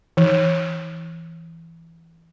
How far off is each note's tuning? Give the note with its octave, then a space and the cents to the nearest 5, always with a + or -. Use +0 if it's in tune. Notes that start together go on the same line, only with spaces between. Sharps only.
E3 +5